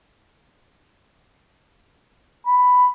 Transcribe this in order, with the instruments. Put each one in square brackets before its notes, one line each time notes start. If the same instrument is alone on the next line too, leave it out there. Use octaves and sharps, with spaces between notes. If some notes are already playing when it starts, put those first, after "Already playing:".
[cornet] B5